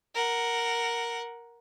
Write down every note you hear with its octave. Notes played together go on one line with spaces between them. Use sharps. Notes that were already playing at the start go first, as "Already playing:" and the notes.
A#4 F#5